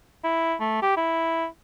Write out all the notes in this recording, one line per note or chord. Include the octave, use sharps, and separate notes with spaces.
E4
A3
G4
E4